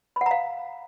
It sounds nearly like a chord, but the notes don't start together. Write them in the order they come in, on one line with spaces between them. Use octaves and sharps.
B5 F#5 A#5 F5